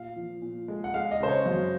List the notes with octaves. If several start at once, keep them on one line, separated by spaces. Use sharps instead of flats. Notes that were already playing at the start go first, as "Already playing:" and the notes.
Already playing: A#2 F5
F3
A#2
G#3
F#5
G#3 F5
D#5
C#3 C5
C#5
F#2